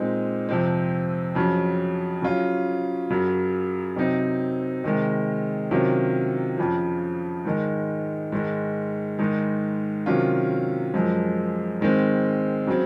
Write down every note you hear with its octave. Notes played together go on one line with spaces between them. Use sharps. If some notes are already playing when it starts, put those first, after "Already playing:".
Already playing: A#2 G#3 C4 D#4
F2 C3 F3 C4
F2 C#3 F#3 C#4
C#3 F#3 C#4 F4
F#2 C#3 F#3
C3 F#3 C4 D#4
C3 D#3 G#3
C3 D#3 F#3 C#4 F4
F2 C#3 F3
G#2 D#3 G#3
G#2 D#3 G#3
G#2 D#3 G#3 D#4
C3 D#3 F#3 C#4 F4
F#2 F3 G#3
G#2 D#3 G#3 C4
C#3 F#3 C4